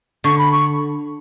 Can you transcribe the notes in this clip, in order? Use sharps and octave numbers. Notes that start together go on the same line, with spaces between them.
D3 C#6
B5
C#6